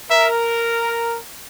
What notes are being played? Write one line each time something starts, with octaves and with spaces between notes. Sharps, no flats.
A#4 E5